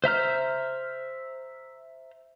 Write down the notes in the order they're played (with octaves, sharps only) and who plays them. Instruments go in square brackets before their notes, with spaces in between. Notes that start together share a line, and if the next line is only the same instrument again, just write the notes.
[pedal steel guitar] C5 E5 A#5 F6